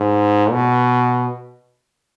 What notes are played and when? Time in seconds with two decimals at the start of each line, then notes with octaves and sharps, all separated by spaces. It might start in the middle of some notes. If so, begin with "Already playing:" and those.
Already playing: G#2
0.51 B2